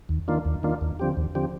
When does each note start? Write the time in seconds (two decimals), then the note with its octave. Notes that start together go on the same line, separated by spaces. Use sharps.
0.09 D#2
0.28 D#3 A#3 D4 F4
0.45 D#2
0.63 D#3 A#3 D4 F4
0.81 D#2
0.99 D3 F3 C4 G4
1.17 D#2
1.35 D3 F3 C4 G4